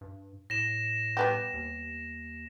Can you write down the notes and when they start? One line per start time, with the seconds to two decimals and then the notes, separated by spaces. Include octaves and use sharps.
0.01 G2
0.50 A2 A#6 E7
1.17 G3 B3 G4
1.54 D#2